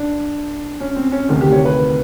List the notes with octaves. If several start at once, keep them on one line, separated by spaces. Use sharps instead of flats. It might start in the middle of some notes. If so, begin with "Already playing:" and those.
Already playing: D4
C#4
C4
C#4
D2 C3 D#3
G4
C#5
B4